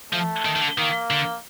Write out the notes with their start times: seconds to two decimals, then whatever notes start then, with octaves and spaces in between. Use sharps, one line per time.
0.13 F3 A3
0.45 D#3
0.56 D#3
0.62 D3
0.78 D#3 A#3
1.10 D3